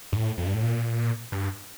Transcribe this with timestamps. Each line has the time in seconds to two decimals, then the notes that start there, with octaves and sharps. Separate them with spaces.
0.12 G2
0.16 A2
0.38 F2
0.46 G2
0.54 A2
0.62 A#2
1.32 G2